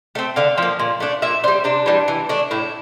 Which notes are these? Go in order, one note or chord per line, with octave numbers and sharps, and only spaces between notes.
A3 C4
D3 F5
F3 A#3
A#2
A3 D4
A#2 E5
G3 D4 C5
C3 D4
E3 G3
E3
A3 D4
A2 E4